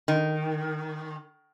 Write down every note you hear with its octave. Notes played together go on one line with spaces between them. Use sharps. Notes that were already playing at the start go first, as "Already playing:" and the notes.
D#3